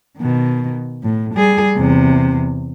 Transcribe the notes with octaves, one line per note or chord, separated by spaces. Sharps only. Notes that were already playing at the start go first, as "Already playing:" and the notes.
B2 D#3
A2
G3 G#4
E2 C3